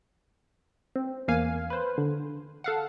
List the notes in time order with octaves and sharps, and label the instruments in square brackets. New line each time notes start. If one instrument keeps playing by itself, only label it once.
[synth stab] C4
E2 A#3 F5 G#5
B4 C5
D3
A4 F5 F#5